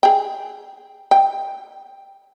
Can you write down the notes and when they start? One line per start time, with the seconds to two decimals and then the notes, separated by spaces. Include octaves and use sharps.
0.03 G#4 G5
1.11 G5